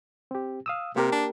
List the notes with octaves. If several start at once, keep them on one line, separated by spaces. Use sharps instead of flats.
C4 G4
F5 D#6 E6
C3 A#3 G4 A#4
D4